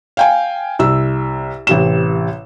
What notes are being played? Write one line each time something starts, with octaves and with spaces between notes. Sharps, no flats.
F5 G5 G#5
C2 E6
A1 C3 E7